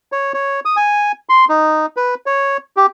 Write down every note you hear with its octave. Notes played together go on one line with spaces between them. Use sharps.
C#5
C#5
D#6
G#5
C6
D#4
B4
C#5
G4